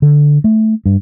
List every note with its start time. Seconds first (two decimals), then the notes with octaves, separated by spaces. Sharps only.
0.02 D3
0.44 A3
0.86 G2